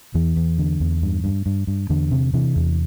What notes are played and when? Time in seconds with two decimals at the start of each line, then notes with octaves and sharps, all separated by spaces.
0.14 E2 E3
0.36 E2
0.58 D3
0.80 E2
1.02 G2
1.24 G2
1.46 G2
1.67 G2
1.90 E2 D3
2.11 C3
2.34 C3 E3
2.56 E2